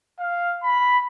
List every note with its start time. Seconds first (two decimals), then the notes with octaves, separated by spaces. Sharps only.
0.19 F5
0.63 B5